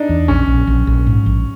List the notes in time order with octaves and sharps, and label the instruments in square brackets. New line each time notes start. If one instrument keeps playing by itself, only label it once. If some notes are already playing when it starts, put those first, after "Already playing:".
Already playing: [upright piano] D4 D#4
[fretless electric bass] E2
[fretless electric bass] A#1 [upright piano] C#4
[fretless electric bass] A#1
A#1
A#1
G#2
A#1